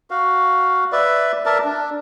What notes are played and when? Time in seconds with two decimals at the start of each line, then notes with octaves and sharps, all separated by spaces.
0.11 F#4 F5
0.92 B4 D5 E5
1.46 A#4 D5 E5 A5
1.64 D4